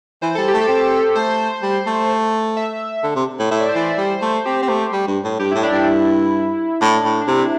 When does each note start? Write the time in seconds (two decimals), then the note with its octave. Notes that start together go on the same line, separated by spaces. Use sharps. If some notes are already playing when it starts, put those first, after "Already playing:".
0.22 E3 C5
0.35 G3 A4
0.48 G4
0.54 A3
0.61 A4
0.68 C4
1.15 A3 C5
1.62 G3
1.87 A3
2.57 E5
3.04 D3
3.16 C3
3.39 A2
3.51 A2 E5
3.60 D5
3.69 C5
3.75 E3 D5
3.98 G3 C5
4.22 A3
4.45 C4 G4
4.62 C4
4.69 A3
4.92 G3
5.08 G2
5.24 A2
5.39 G2 G4
5.51 A2 E4
5.63 D4
5.71 G2 E4
6.81 A2 D4
7.05 A2
7.21 D4
7.27 C3 E4